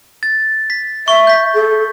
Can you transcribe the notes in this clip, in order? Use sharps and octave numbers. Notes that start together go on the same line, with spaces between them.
A6
B6
E5 C#6 G7
G6 B6
A4